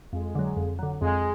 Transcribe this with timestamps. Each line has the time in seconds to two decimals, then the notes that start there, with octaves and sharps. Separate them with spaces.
0.13 F2 G#3
0.35 D3 F#3
0.57 F2
0.79 D3 F#3
1.02 F2 G#3